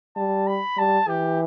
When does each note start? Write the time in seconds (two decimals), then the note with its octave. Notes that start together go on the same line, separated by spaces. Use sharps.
0.17 G3 A5
0.47 B5
0.77 G3 A5
1.08 E3 G4